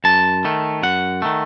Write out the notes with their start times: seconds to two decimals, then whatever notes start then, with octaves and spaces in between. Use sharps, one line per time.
0.04 F#2 A5
0.45 D#3 A3
0.83 F#2 F#5
1.22 D#3 A3